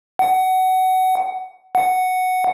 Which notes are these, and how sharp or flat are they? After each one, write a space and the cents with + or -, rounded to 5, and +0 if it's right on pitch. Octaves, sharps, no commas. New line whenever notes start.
F#5 +20
F#5 +0